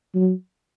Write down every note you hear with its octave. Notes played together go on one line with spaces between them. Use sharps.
F#3